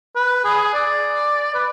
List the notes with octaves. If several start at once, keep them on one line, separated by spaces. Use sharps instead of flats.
B4
G#4
D5
B4